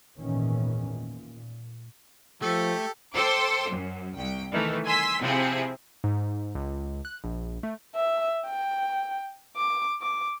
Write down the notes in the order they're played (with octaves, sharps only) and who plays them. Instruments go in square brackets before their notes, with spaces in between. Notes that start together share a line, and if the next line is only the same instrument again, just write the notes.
[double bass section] G#1 E2 A#2 D#3 E3 C#4
A#2
[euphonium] F3 [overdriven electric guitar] A3 [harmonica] G4 A4
[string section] A4 C5 G5 C6 D6
F#2
C2 G5
D#3 E3 A3
G#5 C6 E6 B6
C3 F3 C4 E4 G#4
[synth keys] G#2
C#2
F#6
A#1
A3
[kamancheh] E5
G5
D6
D6